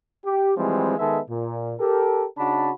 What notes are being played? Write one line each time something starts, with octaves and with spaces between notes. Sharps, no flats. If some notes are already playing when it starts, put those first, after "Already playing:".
G4
E3 F3 G3 G#3 C4
D#3 G#3 B3 A4 E5
A#2
G4 A4 A#4
C#3 D4 D#4 F#4 A5 B5